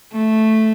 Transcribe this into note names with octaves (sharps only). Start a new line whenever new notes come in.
A3